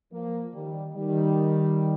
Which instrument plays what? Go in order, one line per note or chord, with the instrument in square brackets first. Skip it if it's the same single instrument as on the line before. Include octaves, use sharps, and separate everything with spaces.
[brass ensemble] F3 A#3
D#3 G3
D#3 G3